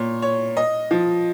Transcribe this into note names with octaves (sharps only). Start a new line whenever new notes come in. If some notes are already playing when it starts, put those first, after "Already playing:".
Already playing: A#2 C#5
C#5
D#5
F3